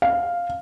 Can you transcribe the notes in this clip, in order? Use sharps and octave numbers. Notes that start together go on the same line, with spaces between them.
F5